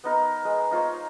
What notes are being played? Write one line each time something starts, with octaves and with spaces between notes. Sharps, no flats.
B3 D#4 A#4
G#3
D#4 F4 C5 C#5